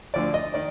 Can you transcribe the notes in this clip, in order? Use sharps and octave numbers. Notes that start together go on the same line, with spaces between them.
D2 D3 F3 D5
D#5
D#3 D5